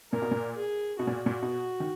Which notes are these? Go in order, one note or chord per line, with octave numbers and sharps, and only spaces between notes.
A#2 A#4
B2
A#2
G#4
B2 F#4
A#2
A#2
B2
D#3